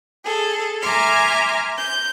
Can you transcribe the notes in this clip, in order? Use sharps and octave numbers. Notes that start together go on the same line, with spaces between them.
G#4 A4
E5 G#5 A#5 C6 D6 F6
G6